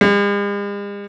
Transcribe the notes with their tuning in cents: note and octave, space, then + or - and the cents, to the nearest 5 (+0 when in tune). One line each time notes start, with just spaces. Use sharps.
G#3 -45